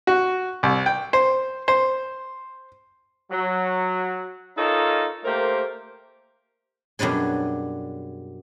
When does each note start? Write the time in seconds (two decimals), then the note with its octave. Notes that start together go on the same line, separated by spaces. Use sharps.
0.07 F#4
0.63 C2
0.86 G5
1.13 C5
1.68 C5
3.31 F#3
4.58 D#4 F4 A4 A#4 C#5 D#5
5.25 A3 A#3 G4 A#4 C5
6.99 F#2 B2 G3 D4 G#4